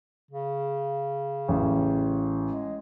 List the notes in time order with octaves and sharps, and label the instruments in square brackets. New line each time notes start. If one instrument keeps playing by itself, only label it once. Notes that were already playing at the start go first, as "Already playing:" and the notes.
[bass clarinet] C#3
[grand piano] A1
[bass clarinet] G#3